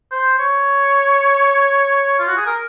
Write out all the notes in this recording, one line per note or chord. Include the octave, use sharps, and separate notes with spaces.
C5
C#5
F4
F#4
G#4
A#4